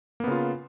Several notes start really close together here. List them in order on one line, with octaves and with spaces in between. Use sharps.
A#3 B3 C#3 F4